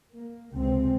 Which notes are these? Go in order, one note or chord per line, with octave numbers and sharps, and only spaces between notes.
A#3
C#2 C3 G#3 C4